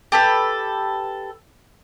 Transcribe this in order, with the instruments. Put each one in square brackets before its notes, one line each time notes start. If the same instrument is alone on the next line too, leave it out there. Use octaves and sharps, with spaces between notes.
[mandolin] G4 A4 B4